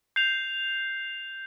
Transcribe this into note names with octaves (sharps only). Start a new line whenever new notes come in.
G6 C7 F7